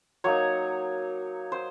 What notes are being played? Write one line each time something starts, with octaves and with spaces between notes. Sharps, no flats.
F#3 A#3 D#4 C#5
C5